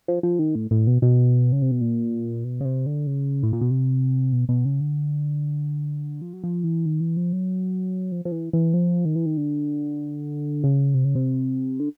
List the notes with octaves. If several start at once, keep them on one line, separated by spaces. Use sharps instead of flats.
F3
F3
D#3
A2
A2
B2
B2
C#3
C3
B2
A#2
B2
C#3
C3
D3
C#3
A2
A#2
B2
C3
B2
B2
C#3
D3
F3
F#3
F3
E3
D#3
E3
F3
F#3
F3
F3
E3
E3
F3
D#3
E3
D#3
D3
C#3
C3
C#3
C3
D3